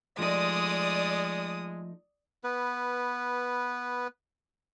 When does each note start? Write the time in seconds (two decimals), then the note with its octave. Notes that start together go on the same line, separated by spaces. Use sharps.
0.19 F3 G#3 A3 D#4 D5 D#6
2.44 B3 B4